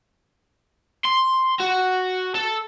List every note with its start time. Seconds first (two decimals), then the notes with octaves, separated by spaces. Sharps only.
1.05 C6
1.60 F#4
2.35 A4